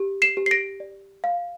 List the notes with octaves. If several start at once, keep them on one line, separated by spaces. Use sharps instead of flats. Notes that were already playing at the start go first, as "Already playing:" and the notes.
Already playing: G4
C7 E7
G4
C7
A#6 D7
D5
F5